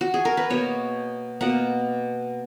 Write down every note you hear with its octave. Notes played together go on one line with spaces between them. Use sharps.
F#4
G#4
A#4
B4
B2 A#3 C#5
B2 A#3 F#5